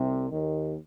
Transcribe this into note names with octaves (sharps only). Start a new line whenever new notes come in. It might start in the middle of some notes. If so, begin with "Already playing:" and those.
Already playing: C2 C3
D#2 D#3